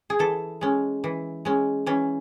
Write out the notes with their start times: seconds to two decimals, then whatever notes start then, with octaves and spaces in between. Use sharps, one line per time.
0.10 G#4
0.19 E3 A4
0.61 G#3 C#4
1.04 E3
1.45 G#3 C#4
1.86 E3 C#4